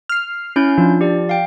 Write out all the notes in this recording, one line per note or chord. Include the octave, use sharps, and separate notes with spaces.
F6 C7
C#4 E4 G6
F3 D4
G4 D5
F5 G5